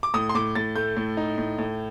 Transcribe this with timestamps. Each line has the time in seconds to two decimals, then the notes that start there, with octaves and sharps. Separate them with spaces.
0.03 D6
0.14 A2 D#6
0.29 C6
0.35 A2 D6
0.55 A2 A6
0.76 A3 G6
0.97 A2
1.17 D#4
1.38 A2
1.58 A2